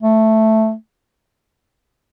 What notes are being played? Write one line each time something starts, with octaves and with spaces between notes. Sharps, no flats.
A3